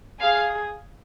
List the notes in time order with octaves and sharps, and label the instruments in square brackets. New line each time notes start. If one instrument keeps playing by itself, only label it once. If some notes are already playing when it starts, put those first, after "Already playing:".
[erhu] G#4 [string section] F5